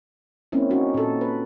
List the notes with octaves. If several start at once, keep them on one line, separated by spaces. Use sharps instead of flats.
G#3 A#3 C4 C#4 E4
G#3 C#4 D#4 F#4
A#2 A4
B4